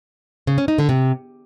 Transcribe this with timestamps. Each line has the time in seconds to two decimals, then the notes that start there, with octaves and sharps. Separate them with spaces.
0.47 C#3
0.58 C#4
0.68 D#4
0.78 D3
0.89 C3